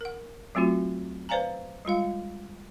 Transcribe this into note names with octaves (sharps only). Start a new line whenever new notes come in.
A#4 F#5
F#3 A3 C4 F4 F#4
B4 C5 D5 F5 G#5 A#5
G3 G#3 F4 F5